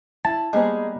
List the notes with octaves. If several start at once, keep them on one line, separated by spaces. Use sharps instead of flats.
E4 A5
G3 G#3 A#3 B3 D#4 G#4 C5 D#5